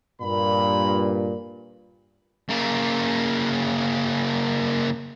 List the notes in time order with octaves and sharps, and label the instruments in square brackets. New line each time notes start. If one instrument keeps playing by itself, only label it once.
[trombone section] G2 A#2 [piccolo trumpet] B5
[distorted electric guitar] C#3 A#3